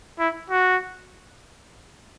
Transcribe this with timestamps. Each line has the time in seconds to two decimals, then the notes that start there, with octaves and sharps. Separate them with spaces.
0.19 E4
0.50 F#4